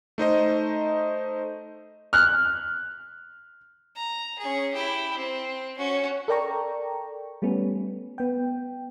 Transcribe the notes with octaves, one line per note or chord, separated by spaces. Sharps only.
A3 D#4 C5 D#5
F6 F#6
A#5
C#4 G#4
E4 G4
C4
C#4 F#4
A4 A#4 D5 G5 A#5 C#6
G3 A3 B3 C#4
B3 G5